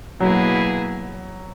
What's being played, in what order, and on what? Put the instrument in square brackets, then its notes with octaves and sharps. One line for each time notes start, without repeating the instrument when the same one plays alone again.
[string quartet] B2 A#3 E4 G#4 B4 [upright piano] F#3